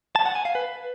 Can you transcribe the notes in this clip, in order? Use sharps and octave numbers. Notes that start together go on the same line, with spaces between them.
A5
F#5
G#5
F5
B4